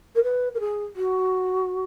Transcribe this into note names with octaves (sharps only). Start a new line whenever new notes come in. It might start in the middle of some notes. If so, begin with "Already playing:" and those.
A#4
B4
A#4
G#4
F#4